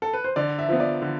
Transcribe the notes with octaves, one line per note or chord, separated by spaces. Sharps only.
A4
B4
C5
D3 D5
E5
F3 B3
D5
D3